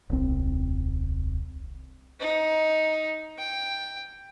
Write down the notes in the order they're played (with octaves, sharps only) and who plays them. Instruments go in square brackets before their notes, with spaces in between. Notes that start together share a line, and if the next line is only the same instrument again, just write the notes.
[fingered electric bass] D#1 C2 C4
[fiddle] D#4
G5